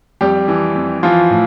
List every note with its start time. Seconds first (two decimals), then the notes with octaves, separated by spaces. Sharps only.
0.21 F2 G3 G4
0.48 E3
0.75 F2
1.03 E3 F3 F4
1.31 A2